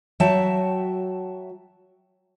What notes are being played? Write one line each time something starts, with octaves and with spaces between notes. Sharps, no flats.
F#3 F#4 E5 G5 A5